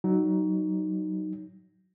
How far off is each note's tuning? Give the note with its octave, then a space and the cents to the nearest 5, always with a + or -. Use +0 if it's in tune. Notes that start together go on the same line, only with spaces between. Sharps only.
F#3 +20 D#4 +0